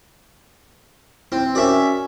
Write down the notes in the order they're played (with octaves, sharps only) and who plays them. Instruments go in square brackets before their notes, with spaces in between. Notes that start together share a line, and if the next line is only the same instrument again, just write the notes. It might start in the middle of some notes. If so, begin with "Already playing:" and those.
[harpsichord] C4 [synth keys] E4
[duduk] C#4 [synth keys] F#4 A#4 C#6 [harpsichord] D5 E5